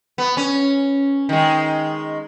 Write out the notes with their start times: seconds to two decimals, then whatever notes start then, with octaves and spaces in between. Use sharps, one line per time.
0.18 B3
0.37 C#4
1.29 D#3 G#3